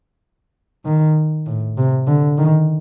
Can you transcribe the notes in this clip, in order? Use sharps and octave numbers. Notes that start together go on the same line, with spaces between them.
D#3
A2
C3
D3
D#3